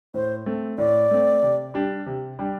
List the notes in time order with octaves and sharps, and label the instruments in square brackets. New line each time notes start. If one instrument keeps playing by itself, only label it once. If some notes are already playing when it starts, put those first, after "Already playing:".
[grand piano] A2 [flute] C5
[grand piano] A3 C4
[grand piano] A2 [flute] D5
[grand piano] A3 C4
C3
G3 D4 G4
C3
G3 D4 G4